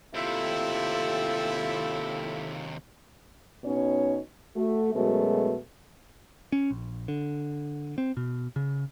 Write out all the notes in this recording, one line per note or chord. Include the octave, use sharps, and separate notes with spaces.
D#2 A2 C3 C4 E4 F4 G4 A4
B2 C#4 D#4 C#5
A3 F#4
F#2 B2 G#3 A3
C#4
A#1
D3
C4
B2
C#3